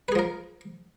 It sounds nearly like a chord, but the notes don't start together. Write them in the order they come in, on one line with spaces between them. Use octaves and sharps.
B4 G#4 F3 A#4